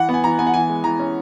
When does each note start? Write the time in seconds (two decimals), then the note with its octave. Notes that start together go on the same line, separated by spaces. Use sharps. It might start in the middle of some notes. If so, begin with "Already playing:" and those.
Already playing: E3 F#5
0.09 B3
0.14 G#5
0.24 E3 A#5
0.39 B3 G#5
0.47 F#5
0.54 E3 G#5
0.69 G#3
0.84 E3 A#5
0.99 C#4